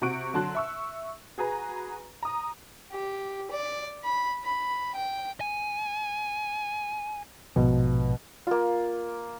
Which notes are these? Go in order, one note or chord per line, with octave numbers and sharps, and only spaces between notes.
C3 F#4 F#5 C#6 F#6 D7
D3 F#3 A5 C6 F#6
E5 C#6 E6
F#4 G#4 B4 A#5
A#5 D#6
G4
D5
B5
B5
G5
G#5
A#1 G#2 B2 F3
A#3 F4